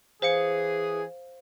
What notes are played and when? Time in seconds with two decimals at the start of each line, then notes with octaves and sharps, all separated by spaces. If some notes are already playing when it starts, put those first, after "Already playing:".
0.22 E3 G#4 C5 F5 C#7